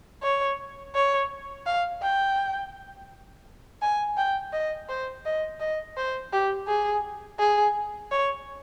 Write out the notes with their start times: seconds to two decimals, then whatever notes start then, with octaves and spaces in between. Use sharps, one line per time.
0.23 C#5
0.95 C#5
1.66 F5
2.02 G5
3.82 G#5
4.17 G5
4.53 D#5
4.89 C5
5.25 D#5
5.60 D#5
5.97 C5
6.33 G4
6.67 G#4
7.39 G#4
8.11 C#5